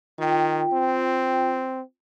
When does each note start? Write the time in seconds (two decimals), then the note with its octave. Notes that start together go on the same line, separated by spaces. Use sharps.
0.18 D#3 F4 G5
0.73 C4